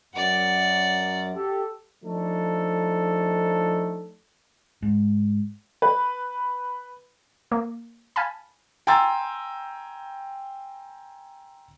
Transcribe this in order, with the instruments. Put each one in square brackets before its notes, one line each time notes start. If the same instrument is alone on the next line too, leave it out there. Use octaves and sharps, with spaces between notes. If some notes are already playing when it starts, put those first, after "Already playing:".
[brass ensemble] F#2 [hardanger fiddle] D5 F#5
[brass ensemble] G4 A4
F3 A3 D4 D#4 A4
[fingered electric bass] G#2
[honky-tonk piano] B4
[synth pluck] A#3
F5 G#5 A5 B5
[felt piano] G5 G#5 A#5 C6 E6 A6